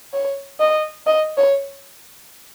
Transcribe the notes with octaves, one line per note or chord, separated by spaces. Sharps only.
C#5
D#5
D#5
C#5